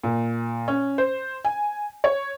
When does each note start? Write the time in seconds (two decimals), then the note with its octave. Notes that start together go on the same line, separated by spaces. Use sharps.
0.04 A#2
0.68 C#4
0.98 C5
1.45 G#5
2.04 C#5